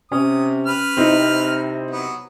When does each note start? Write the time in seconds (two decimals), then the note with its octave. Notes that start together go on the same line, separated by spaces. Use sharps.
0.12 C3 C#4 D#6
0.67 B4 F6
0.97 C3 C4 D#4 E4
1.91 F#3 B3